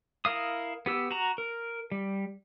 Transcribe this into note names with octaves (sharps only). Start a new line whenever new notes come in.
E4 A#4 F5 D#6
B3 G4 E6
F#4 A#5
A#4
G3